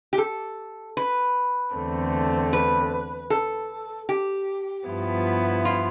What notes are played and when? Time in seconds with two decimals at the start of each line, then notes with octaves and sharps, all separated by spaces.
0.13 G4
0.18 A4
0.97 B4
1.74 E2 D3 A3 C4
2.53 B4
3.30 A4
4.09 G4
4.87 G2 F3 B3 E4
5.65 F4